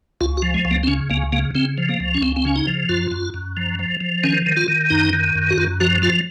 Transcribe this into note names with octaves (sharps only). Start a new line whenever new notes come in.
C#2 F4
F#4
F3
G#3
C#2
A#3
C4
C#3 C#4
C#2 A#3
C#3 A#3
C#3 C4
F3
A#3
C#2
C#4
C#2 C4
C4
C#3 C#4
D#4
F3
F#2 F4
F#2
F#2
F3
F3
F3
D#3 C#4
D#3
F4
D#3
F#2 D#4
D#3
F#2
F#4
F#2 F4
F3 F#4
F3 F4